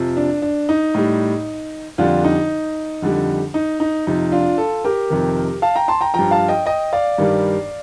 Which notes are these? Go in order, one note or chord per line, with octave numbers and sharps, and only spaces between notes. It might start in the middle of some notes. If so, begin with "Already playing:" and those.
Already playing: F2 C3 F3
D4
D4
D#4
A2 G3
F2 D3 G3 D4 F4
D#4
F2 D3 G3
D#4
D#4
F2 C3 F3 D#4
D4 F4
F4 A4
G4 A#4
F2 C3 D#3
F5 A5
G5 A#5
A5 C6
G5 A#5
G2 F3 G5 A#5
F5 A5
D#5 G5
D#5 G5
D5 F5
G2 D#3 G3